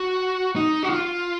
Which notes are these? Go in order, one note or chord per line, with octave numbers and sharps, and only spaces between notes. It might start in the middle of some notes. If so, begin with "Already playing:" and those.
Already playing: F#4
D#4
F#4
F4